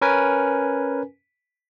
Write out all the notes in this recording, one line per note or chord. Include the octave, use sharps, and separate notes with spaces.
C#4 A#4 B4 G#5